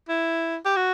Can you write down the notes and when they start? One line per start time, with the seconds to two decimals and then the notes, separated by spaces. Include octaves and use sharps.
0.09 E4
0.66 G4
0.77 F#4